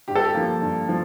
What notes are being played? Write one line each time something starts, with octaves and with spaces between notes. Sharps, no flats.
G2 G4
A4
G4
F3 A#3
G2
F3